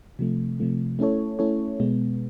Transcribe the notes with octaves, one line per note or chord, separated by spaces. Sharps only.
C3 F3 A3
C3 F3 A3
A3 C#4 E4 A4 C#5
A3 C#4 E4 A4 C#5
B2 G#3 B3